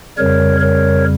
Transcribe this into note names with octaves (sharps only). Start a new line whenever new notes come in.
F2 C#3 G3 A#4 C#5
A#4 C#5